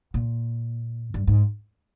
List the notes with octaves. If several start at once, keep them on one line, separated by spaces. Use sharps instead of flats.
A#2
G2
G#2